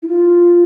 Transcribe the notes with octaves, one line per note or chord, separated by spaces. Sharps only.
E4
F4